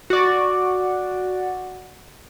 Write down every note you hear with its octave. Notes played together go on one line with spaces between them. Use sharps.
F#4 D5